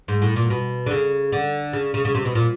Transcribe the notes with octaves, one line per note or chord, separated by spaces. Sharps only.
G#2
A2
A#2
B2
D3
C#3
D3
C#3
C#3
C#3
C3
B2
A#2